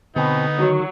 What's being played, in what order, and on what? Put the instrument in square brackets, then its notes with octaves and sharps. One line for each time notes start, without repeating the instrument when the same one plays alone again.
[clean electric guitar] B2 C4 [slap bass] D3 [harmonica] B3 D#4
[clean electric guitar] D#3 [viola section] F#3